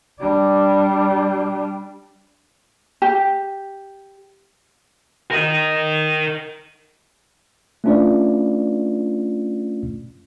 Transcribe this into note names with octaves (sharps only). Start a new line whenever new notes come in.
G3 D4
G4
A#4 D#5
A3 C#4 D4 F4 B4 D5